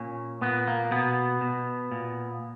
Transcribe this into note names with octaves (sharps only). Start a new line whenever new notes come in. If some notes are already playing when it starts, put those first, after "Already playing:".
Already playing: A#2 C#4
A#2 B3
A#3
B2 B3
B2
A#2